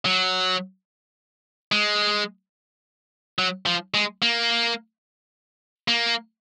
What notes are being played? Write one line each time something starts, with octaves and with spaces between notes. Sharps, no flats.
F#3
G#3
F#3
F3
G#3
A#3
A#3